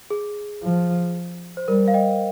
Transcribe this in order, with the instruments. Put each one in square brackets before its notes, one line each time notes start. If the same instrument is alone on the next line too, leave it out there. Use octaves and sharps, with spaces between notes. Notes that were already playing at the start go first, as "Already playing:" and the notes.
[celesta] G#4
[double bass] F3
[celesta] C5
[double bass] G3 [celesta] A#4
[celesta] F5
D#5 G5